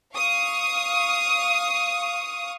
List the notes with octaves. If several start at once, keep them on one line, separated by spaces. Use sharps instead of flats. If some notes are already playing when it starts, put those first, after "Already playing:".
F5 C#6 D#6